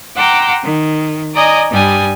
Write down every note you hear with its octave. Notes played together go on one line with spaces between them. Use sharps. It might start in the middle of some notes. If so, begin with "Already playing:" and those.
F#5 G5 A#5 C6 D6 E6
D#3
D5 D#5 G#5 A#5 D#6
G2 G3 G#5 D#6